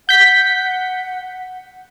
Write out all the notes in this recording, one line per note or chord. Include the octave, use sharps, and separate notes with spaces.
F#5 G6 B6